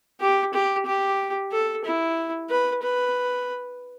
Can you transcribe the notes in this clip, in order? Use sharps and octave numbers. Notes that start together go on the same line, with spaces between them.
G4
G4
G4
A4
E4
B4
B4